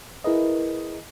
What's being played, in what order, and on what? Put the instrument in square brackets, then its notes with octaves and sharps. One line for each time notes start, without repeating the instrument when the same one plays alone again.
[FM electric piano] E4 G#4 A#4 B4 D#5